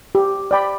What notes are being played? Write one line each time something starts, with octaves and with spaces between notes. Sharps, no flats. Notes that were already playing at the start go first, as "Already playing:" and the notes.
G4
D5 G5 B5